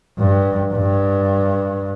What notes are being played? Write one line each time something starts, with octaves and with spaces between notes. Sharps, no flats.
G2
G2